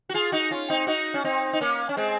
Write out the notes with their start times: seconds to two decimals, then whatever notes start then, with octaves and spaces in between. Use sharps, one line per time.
0.09 F#4
0.14 F4 G#4
0.32 D#4 F#4
0.51 C#4 F4
0.70 C4 D#4
0.87 D#4 F#4
1.14 C#4
1.24 C4 D#4
1.53 D#4
1.61 A#3 C#4
1.89 C#4
1.97 G#3 C4